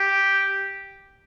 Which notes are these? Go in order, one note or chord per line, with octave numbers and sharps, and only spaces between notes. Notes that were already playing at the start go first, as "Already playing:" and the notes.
Already playing: G4